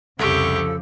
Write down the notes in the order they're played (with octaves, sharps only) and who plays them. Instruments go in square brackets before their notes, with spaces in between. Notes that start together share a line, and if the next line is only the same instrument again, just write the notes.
[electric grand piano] C2 [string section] F2 C#3 F3 [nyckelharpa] G4 C#6 [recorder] A4